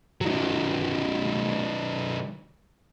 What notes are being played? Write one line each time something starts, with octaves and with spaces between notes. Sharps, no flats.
D#3 F#3